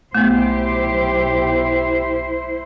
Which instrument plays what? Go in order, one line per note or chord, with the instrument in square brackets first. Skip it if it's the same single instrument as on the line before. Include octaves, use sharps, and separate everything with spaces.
[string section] B1 G4 [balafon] A3 B3 [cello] E4 C5